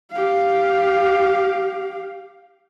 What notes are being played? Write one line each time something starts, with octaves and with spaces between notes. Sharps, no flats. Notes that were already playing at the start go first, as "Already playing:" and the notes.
G4 F5